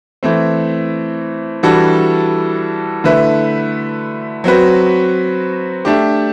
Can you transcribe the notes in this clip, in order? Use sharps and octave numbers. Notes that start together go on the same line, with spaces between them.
E3 A3 C4
E3 G3 D4 F#4 A4
D3 A3 E4 B4
F#3 C4 F#4 B4
A3 D4 G4